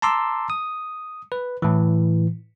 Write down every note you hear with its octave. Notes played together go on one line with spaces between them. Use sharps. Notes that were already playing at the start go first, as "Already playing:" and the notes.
A5 A#5 C6 D6 E6
D#6
B4
A2 E3